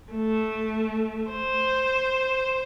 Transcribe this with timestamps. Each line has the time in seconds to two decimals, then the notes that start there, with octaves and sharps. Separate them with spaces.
0.14 A3
1.31 C5